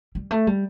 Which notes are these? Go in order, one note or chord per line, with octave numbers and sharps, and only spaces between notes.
G3
A3
G3